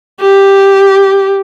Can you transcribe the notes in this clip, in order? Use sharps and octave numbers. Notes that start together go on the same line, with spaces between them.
G4